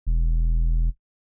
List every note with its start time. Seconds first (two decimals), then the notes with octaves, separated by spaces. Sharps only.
0.07 E1